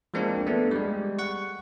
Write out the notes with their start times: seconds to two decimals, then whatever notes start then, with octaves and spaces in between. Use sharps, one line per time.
0.14 F3 G#3 A#3 C4 D4
0.47 A3 B3 D4
0.71 G3 G#3
1.19 F#5 C#6